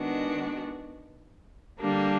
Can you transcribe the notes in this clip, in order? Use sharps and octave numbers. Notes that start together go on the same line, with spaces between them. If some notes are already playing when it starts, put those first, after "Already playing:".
Already playing: D#3 G#3 B3 D4 F#4
D3 G3 A#3 D4